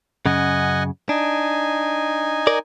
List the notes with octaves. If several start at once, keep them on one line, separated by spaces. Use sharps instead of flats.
F#2 C#3 D#5 F#5 G#5
D4 D#4 G#5
A#4 D5